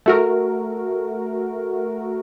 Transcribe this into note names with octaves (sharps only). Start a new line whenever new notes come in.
A3 F#4 A#4